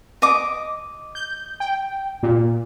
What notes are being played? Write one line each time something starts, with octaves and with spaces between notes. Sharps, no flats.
D#5 D6
G6
G5
A#2